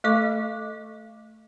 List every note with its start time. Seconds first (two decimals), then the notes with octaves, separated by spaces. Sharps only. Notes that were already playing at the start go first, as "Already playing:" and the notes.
0.04 A3 A4 D#5 C#6 D6